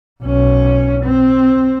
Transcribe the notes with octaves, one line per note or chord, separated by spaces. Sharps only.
B1 C#4
C4